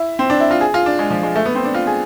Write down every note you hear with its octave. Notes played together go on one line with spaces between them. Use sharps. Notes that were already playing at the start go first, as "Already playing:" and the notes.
Already playing: E4
C4
D4
E4
F4
G#4
F4
D4
G#3
F3
G#3
A3
B3
C4
D4
F4
G#4